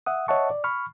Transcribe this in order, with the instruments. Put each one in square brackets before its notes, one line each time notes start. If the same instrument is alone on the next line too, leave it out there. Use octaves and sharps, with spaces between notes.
[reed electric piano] E5 F#5 D#6
C#5 D#5 E5 F#5 A5 C#6
D5
B5 C#6 F6